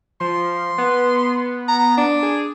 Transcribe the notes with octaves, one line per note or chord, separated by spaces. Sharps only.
F3 C6
B3
A#5
D4
G#4